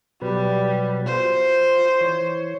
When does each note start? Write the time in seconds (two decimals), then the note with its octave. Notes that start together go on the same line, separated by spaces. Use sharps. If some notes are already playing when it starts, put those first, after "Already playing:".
0.22 B2 F#3 G3 B4
1.06 F4 C5
2.01 E3 C#5